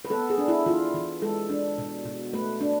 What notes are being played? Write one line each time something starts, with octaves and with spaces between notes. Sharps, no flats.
B4
B3 A4
G#4
D4
E4
E3 F4
E3
G#3 A4
D4
B2
B2
A3 B4
D4